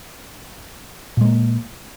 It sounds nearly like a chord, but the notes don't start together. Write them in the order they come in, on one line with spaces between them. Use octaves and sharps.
A#2 G#3 A#3